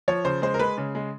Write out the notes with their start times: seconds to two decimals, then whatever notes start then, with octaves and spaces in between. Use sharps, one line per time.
0.08 F3 C#5
0.25 C#3 C5
0.42 G#3 C5
0.54 A#4
0.59 G#3 B4
0.78 C#3
0.95 G#3